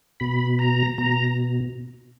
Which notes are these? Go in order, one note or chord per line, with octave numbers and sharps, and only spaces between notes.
B2 B5
A#5
B2 A#5